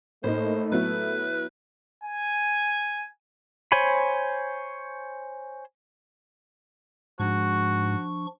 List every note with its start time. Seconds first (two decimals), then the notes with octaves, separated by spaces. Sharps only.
0.24 A2 A3 A#3 D#4 C5
0.72 F#3 B3 E4 B4
2.04 G#5
3.72 C5 C#5 G#5 B5
7.20 G#2 F3 D4 F#4 C#6